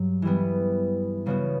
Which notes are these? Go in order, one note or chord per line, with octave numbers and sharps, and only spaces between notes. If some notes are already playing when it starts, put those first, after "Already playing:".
Already playing: G2 F#3
E3 G3 B3
C#3 G3 B3 F#4